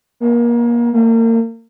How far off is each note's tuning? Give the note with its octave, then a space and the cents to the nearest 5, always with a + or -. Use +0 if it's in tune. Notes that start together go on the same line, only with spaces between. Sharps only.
A#3 +30
A#3 -35